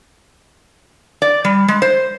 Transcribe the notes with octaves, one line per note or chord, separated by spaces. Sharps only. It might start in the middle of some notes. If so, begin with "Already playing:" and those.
D5
G3
G#3
C5